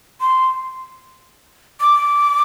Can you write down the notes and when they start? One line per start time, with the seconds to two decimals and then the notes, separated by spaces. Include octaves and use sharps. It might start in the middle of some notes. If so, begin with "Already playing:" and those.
0.21 C6
1.80 D6